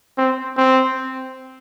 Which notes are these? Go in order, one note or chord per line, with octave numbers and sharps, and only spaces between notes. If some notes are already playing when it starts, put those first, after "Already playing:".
C4
C4